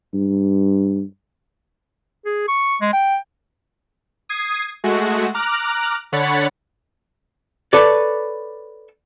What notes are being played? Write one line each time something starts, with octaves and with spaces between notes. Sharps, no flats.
G2
G#4
C#6
G#3
G5
D#6 G#6 C7
G#3 A3 F#4
A#5 D6 F6 F#6
D3 C#5 F#5 B5 A6 C#7
A4 B4 C#5 D5